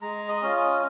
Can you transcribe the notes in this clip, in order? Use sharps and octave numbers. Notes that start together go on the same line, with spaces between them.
G#3 A#5
D#5
C#4 F4
D#5